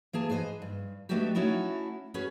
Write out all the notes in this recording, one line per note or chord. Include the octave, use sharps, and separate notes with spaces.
E3 A#3 G#4 A5
G#4 B4 C5 D#5
G2
G#3 A3 B3 D4 F#4 G4
A3 C#4 D#4 E4 F#4
C#4 F#4 G#4 B4